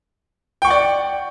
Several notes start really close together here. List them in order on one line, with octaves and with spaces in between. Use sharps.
G5 C#6 F#5 D5